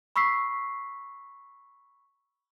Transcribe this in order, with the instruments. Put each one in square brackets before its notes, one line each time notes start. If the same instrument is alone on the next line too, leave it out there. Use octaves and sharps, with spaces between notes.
[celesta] B5 C#6 E6 B6 C7